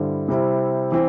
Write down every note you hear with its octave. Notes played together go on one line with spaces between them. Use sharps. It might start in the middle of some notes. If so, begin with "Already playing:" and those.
Already playing: G2 D3 G3 E4 C5
C3 G3 C4 E4
E3 C4